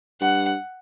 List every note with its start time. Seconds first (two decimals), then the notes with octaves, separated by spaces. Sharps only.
0.21 G2 F#5